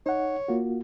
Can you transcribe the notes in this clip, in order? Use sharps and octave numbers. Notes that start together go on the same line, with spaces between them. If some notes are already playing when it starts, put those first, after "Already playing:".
D#4 C#5 F#5
A#3 F4 F#4